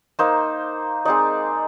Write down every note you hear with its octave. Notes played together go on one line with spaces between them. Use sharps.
A#3 D#4 C5
G#3 C4 D#4 D5